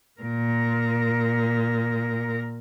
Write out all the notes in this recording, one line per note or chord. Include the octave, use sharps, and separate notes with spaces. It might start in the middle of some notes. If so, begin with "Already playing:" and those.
A#2 A#4